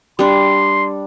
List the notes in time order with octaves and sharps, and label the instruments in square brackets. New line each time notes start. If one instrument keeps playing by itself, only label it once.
[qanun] G3 D4 [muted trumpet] C6